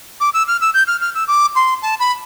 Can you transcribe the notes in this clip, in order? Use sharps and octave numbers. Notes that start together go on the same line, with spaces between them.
D6
E6
F6
E6
G6
F6
F6
E6
D6
C6
A5
B5